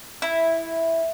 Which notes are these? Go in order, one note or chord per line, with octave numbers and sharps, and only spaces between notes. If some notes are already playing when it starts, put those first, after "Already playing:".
E4